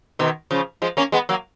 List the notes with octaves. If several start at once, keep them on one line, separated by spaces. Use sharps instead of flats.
B2 D#3
C#3 F3
F3 G#3
A#3 C#4
G#3 B3
F#3 A#3